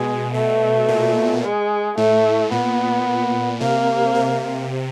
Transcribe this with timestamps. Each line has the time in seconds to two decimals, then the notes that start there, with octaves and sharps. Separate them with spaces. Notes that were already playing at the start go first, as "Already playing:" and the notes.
Already playing: B2 G#3
0.34 B2 A3
0.88 A#2
1.44 G#3
1.97 A2 A3
2.52 A#2 B3
3.61 C3 A#3
4.15 C3